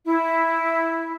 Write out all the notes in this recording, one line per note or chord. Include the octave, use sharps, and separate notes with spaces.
E4